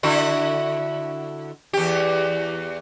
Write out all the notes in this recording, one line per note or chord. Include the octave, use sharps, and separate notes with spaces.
D3 E4 F#4
E2 G4